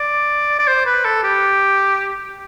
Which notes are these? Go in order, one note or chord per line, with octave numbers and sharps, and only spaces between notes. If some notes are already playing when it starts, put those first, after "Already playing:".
Already playing: D5
D5
C5
B4
A4
G4